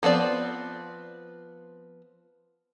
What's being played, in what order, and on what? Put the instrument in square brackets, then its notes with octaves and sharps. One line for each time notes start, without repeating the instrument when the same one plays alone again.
[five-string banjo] F3 B3 C4 D5